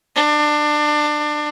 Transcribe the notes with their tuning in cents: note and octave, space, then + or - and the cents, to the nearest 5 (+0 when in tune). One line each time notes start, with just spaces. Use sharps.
D4 +25